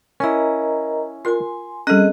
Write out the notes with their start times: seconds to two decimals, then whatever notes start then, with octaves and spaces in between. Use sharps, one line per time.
0.20 C#4 E4 A#4 D#5 A#5
1.25 F4 A#4 G#5 C6
1.87 G3 C4 C#4 G#4 A4 D#5 F#6